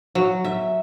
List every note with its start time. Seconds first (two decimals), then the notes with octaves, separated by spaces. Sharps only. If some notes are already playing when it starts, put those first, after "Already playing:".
0.15 F#3
0.44 E5